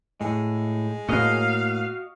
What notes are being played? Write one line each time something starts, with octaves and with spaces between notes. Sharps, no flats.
A2 G#3
A2 A#3 F#4 D#5 F5